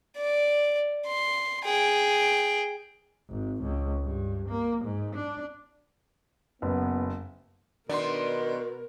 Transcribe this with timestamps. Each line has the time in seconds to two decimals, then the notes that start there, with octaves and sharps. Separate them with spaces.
0.16 D5
1.06 C6
1.64 G#4 G5
3.30 G#1
3.62 C#2
4.04 G2
4.49 A#3
4.85 G#2
5.16 D4
6.62 F#1 B3
7.89 B2 D#3 B3 D4 A#4 D5 C6